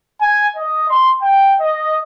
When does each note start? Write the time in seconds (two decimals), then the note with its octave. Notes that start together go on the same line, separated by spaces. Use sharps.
0.22 G#5
0.56 D#5
0.89 C6
1.22 G5
1.61 D#5